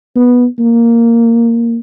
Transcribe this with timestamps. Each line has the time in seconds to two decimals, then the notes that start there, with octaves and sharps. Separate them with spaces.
0.16 B3
0.59 A#3